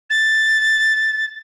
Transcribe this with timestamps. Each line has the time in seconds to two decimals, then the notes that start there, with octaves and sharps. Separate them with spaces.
0.10 A6